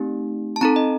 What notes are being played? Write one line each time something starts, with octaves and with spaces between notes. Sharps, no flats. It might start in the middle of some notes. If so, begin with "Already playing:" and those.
Already playing: A3 C4 D#4 G4
A5
C4 D#4 A4 A#5
D#5